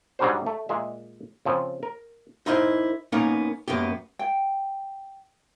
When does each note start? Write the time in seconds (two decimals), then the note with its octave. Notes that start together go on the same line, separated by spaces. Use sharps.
0.19 G#2 F#3 G3 D4 F#4 C5
0.46 A3
0.69 A#2 G#3 E5
1.45 C#3 F3 C4
1.83 A#4
2.46 D#4 E4 A#4 C5 D#5
3.12 A#3 B3 C#4 D#4 A#4 F5
3.68 F#2 A#3 B3 G4
4.19 G5